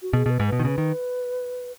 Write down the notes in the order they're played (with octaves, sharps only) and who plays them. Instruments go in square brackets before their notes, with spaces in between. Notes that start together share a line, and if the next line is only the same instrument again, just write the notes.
[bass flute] F#4
[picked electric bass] B2 [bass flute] G#4
[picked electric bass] B2 [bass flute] B4
[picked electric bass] G#2
[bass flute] B4
[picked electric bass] B2
D#3
[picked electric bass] C#3 [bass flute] B4
[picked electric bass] D#3